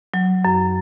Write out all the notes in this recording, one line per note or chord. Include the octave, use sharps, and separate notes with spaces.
F#3
F#2